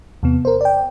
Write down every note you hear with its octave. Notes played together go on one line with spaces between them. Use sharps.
E2 C3 B3
A#4 C5
D5 G5